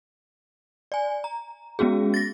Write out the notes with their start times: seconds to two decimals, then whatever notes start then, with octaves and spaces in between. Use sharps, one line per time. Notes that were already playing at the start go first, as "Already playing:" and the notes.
0.92 D5 G#5
1.24 A#5
1.79 G#3 B3 C#4 F#4 G#4
2.14 A6 A#6